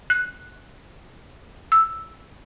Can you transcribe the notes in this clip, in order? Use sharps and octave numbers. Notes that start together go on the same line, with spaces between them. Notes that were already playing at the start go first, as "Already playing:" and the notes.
F#6
E6